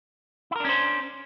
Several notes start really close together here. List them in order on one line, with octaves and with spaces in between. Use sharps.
E4 A#4 D4 C#4 C5